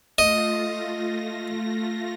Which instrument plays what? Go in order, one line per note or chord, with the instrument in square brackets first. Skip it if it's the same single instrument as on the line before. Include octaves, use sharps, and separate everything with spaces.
[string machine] A3 F4 A#6 [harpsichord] D#5